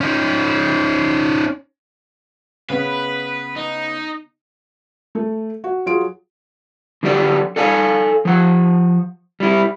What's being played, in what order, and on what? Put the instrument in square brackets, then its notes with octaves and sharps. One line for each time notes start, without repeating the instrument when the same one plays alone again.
[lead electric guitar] C#4 D#4
[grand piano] C#3 B3 [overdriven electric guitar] B4
[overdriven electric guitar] D#4
[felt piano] A3 A4
F#4
F#3 F4 G#4 D7
[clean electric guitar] D3 F#3 B3 G4 D5
A4 D5 F5 G#5
F3 F#5
G3 E4